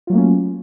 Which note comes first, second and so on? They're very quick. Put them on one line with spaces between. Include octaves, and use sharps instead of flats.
F4 F#3 A3 A#3 C#4